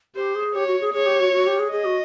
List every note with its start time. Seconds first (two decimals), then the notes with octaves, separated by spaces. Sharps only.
0.16 G4 C5
0.35 G#4
0.55 G4 C#5
0.67 F#4
0.81 G#4
0.93 G#4 C#5
1.06 G4
1.20 F#4
1.33 F#4
1.47 G4
1.59 G#4
1.72 G#4 D#5
1.85 F#4